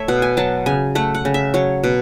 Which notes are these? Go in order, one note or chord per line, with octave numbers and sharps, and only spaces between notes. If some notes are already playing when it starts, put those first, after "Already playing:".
Already playing: A3 C#5 E5
B2 F#5
G#5
F#3 A5
C#3 G#5
A3 F#5
F#5
C#3
E5
F#3 C#5
B2